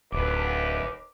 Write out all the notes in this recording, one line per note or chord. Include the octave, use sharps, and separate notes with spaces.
D1 D#2 B4 D6